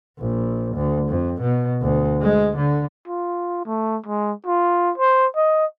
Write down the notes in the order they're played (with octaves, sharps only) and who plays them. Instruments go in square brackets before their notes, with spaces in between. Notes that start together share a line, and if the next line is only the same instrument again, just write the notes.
[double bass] A#1
D2
F2
B2
D2
G#3
D3
[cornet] F4
A3
G#3
F4
C5
D#5